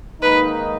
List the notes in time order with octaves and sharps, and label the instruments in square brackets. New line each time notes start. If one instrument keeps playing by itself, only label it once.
[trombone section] G#2 D#3 A#3 D#4 [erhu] B4